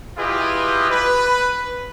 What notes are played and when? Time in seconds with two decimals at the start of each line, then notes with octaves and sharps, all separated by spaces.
0.17 E4 F4 G4 G#4 B4 D#5
0.90 B4